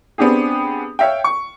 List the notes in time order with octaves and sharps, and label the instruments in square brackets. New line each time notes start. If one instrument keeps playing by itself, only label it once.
[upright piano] B3 C4 D4 G4 G#4
C#5 E5 F5 G5
C#6